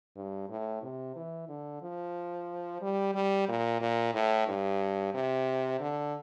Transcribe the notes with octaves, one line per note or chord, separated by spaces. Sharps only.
G2
A2
C3
E3
D3
F3
G3
G3
A#2
A#2
A2
G2
C3
D3